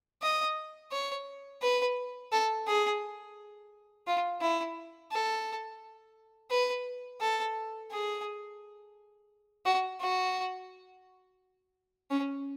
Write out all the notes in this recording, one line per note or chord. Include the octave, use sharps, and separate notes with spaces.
D#5
C#5
B4
A4
G#4
F4
E4
A4
B4
A4
G#4
F#4
F#4
C#4